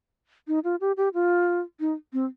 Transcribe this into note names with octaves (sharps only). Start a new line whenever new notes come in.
D#4
F4
G4
G4
F4
D#4
C4